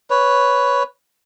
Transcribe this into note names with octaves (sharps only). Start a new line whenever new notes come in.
B4 C#5